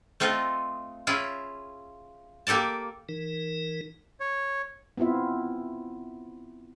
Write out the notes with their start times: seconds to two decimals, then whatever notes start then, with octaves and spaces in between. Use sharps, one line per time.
0.20 A3 C4 F4 A4 D#5
1.07 C#4 E4 F4 G#4
2.47 A#3 G4 A4 D5 A5
3.09 E3 D#4 A#4
4.20 C#5
4.97 B3 C4 E4 F4 E5